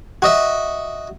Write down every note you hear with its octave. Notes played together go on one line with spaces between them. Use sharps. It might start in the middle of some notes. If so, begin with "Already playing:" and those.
F#4 D#5 E5